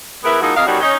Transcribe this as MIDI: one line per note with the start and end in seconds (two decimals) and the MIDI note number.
0.23 0.41 52
0.23 0.41 56
0.23 0.41 59
0.23 0.41 64
0.23 0.41 70
0.23 0.41 71
0.41 0.50 53
0.41 0.50 56
0.41 0.50 58
0.41 0.50 63
0.41 0.50 64
0.41 0.50 66
0.54 0.62 41
0.54 0.62 70
0.54 0.62 75
0.54 0.62 77
0.66 0.79 42
0.66 0.79 47
0.66 0.79 55
0.66 0.79 63
0.66 0.79 66
0.80 0.95 61
0.80 0.95 63